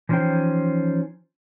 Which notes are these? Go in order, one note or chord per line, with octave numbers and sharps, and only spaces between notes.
E3 F3 C#4 D#4 C5 G5